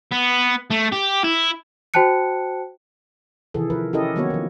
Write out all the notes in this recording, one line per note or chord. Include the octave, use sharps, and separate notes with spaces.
B3
A3
G4
E4
F#4 C5 G5 A5 F#6 C#7
C3 D#3 E3 G#4 A4
F3 A#4 B4
C#4 E4 G4 A4 A#4 D#5
D#3 F#3 A#3 B3 F#4 C#5
D#3 F3